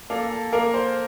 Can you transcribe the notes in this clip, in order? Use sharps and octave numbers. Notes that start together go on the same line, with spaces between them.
A#3 A4
A4
A#3 A#4
C5